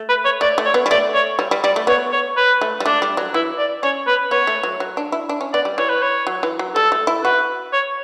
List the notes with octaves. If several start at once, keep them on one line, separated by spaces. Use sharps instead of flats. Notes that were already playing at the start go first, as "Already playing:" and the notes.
Already playing: A3
B4
C#5
A3 D5
A3
C#5
B3
G3
A3 D5
C#5
G3
G3
G3 D5
A3
B3 C#5
C#5
B4
A3
G3
A3 D4
G3
F#3
E3 E4
D5
C#4 C#5
B4
B3 C#5
A3
F#3
F#3
D4
E4
D4
C#4
B3 D5
G3
E3 C#5
B4
C#5
F#3
E3
F#3
G3 A4
A3
E4
F#4 B4
C#5